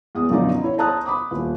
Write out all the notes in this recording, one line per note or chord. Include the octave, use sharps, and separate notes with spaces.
E2 D#6
F#2 B2 D3 F3 D#4 D5
E4 C#5
C5 A5 A#5 D#6 F#6
B5 D6 D#6
D#1